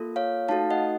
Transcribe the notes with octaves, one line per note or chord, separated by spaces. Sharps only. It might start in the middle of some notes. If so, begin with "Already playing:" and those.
Already playing: A#3 F4 A4
C#5 F5
A3 D#4 F#4 A4 F5 A5
D#5 F#5